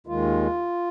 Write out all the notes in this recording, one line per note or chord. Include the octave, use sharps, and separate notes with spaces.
D#2 D#3 G#3 F4